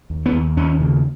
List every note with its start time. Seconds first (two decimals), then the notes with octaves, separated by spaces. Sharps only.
0.10 D#2
0.26 B3
0.33 D#2
0.57 D#2 C#4
0.80 C#3